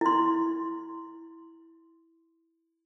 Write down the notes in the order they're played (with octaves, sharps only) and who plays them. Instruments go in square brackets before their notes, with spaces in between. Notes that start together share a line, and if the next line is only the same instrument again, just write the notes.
[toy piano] E4 C6